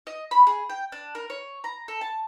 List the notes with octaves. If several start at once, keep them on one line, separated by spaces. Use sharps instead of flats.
D#5
B5
G#4
G5
D4
A#4
C#5
A#5
A4
A5